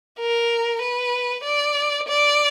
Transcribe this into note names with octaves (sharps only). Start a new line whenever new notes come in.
A#4
B4
D5
D5